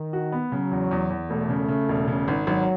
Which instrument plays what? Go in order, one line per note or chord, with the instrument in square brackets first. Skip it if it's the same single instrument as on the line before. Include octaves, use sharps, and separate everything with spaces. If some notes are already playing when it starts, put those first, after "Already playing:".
Already playing: [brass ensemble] D#3
[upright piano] F#4
B3
[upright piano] C#3 [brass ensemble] F#3
[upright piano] E2
E2
E2
[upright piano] E1 [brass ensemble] A3
[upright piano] C#3
C#3
E1
C#3
G#1
[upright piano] G#1 [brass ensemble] F#3